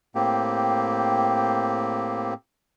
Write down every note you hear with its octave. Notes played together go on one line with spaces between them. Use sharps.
A2 A#3 C4 G4